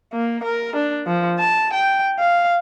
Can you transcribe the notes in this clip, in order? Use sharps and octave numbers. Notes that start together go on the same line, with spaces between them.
A#3
A#4
D4
F3
A5
G5
F5